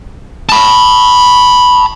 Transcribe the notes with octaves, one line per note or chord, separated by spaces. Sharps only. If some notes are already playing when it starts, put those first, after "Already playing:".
A5 B5